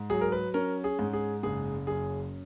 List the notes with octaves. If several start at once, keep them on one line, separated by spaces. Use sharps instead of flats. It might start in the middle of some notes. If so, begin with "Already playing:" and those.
Already playing: G#2
F#3 G#4
A#4
B4
C#4 A#4
G#4
G#2
G#4
F#1 G#4
F#2 G#4